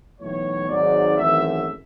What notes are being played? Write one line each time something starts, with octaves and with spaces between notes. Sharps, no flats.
B1 A2 E3 A3 C#5
G#1 G#2 F#3 D5
G#1 F#2 E3 A3 E5